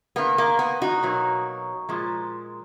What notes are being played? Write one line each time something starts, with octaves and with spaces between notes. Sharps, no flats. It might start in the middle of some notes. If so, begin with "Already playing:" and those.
D#3 A#3 B3
A#3
B3
D#4 F#4
B2 F#3 A#3
A#2 F3 G#3